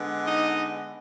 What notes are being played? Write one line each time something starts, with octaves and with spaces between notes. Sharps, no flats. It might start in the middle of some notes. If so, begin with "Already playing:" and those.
Already playing: D3 G#3 B3
D#4 D#5